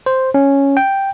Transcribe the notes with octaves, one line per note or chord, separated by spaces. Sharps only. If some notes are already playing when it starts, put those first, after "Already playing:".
C5
C#4
G5